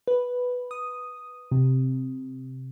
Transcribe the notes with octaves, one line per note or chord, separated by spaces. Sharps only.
B4
D#6
C3